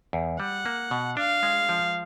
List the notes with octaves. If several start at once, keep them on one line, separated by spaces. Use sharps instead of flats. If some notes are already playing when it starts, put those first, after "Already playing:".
E2
G3 F#5
A#3
B2
D4 F5
G#3
F3